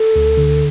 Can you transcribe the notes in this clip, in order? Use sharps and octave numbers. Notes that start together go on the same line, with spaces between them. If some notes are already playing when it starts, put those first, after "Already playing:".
Already playing: A4
D2
D3